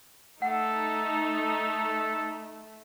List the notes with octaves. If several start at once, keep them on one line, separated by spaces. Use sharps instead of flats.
A3 D#4 A4 F#5